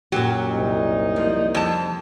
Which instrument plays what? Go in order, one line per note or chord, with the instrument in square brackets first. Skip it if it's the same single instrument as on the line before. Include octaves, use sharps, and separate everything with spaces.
[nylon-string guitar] F#2 A#2 G4 [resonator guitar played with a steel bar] F#3
[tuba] C2 [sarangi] D#4
[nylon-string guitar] F3 A#3
[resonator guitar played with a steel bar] F2 A5